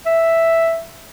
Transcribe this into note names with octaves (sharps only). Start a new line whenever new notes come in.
E5